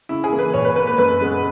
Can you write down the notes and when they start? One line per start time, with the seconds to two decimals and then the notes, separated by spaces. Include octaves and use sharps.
0.09 C#3 E4
0.24 G#4
0.32 E3 A#3
0.39 B4
0.54 A#2 C#5
0.65 B4
0.76 A#3 B4
0.87 B4
0.98 F#2 B4
1.21 C#3 G#3 B3